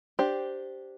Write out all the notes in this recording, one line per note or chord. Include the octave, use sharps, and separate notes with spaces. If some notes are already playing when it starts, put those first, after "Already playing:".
D4 G4 C5